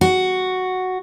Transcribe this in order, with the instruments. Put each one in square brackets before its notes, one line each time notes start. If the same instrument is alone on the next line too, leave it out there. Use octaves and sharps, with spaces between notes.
[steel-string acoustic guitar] F#4